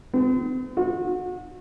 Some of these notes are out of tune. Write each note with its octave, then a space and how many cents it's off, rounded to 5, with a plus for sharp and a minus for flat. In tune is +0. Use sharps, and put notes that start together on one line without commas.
C4 -45
F#4 -30